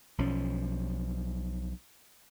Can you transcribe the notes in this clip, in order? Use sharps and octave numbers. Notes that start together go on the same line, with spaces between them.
B1 F3 C#4